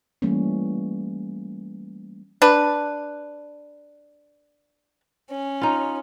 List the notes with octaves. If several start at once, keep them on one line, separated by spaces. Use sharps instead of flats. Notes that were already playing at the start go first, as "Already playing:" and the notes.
E3 G3 A3 A#3 C#4
D4 B4
C#4
D#4 F4